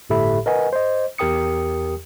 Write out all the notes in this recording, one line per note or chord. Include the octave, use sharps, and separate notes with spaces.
G1 A2 G4 A4 E5 B5
A#4 B4 D#5 F#5 G#5
C5 D#5
E2 G4 A#4 G5 D#6 C#7